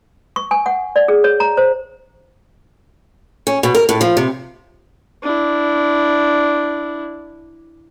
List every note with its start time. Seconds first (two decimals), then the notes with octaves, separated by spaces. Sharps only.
0.36 C#6
0.51 G#5
0.66 F#5
0.96 D5
1.08 G#4
1.24 C#5
1.40 A#5
1.57 C5
3.47 C#4
3.63 B2
3.75 A#4
3.89 A2
4.01 F3
4.17 C3
5.22 D4 E4